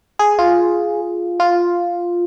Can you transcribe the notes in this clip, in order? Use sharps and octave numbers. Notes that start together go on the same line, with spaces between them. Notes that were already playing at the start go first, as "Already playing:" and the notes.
G#4
F4
F4